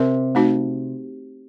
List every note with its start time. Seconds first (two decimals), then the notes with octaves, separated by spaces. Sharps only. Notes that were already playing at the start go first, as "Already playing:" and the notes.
Already playing: C3 C4 A#4
0.35 A3 C4 D#4 F#4